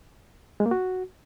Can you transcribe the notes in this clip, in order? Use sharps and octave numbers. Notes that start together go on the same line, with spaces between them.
G#3
A#3
F#4